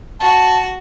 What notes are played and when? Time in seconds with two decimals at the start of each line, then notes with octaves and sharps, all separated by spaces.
0.20 F#4 A5